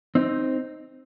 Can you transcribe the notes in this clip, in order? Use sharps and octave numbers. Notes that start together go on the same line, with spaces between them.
C4 D#4